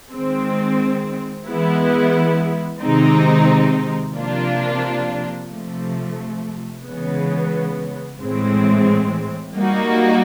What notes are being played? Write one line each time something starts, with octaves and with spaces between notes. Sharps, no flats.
D#3 G#3 C4
E3 G#3 B3 E4
C3 D#3 G#3 C4 D#4
C3 F3 A#3 D4 F4
C3 F3 A3
C#3 E3 G#3 B3
A2 E3 G#3 C4
G3 A#3 D#4 F#4